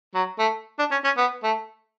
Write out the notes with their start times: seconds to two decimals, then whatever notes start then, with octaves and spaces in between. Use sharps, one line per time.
0.14 F#3
0.39 A3
0.79 D4
0.91 C#4
1.04 C#4
1.17 B3
1.43 A3